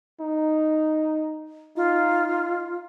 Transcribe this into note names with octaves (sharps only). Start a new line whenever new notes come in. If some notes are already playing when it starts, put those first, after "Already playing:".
D#4
D#4 F4